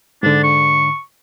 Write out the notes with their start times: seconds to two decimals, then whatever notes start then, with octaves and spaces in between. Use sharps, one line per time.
0.23 G#2 D3 D4
0.44 C#6